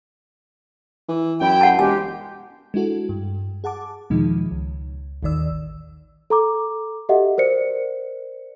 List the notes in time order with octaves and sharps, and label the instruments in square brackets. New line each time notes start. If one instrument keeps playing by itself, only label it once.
[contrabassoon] E3
[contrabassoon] F#2 [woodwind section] E4 G5
[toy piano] F#4 F#5 A5
[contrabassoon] E1 [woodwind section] G#3 G4 [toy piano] G#5
[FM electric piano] G#3 D4 E4 F#4 A4
G2
G#4 F#5 A5 D6
E2 B2 D#3 F3 G#3 D#4
C#2
A1 D#2 D#3 D5 E6
[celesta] A4 A#5 D6
F#4 G4 A4 D#5 E5 F#5
A#4 C5 D5 C#7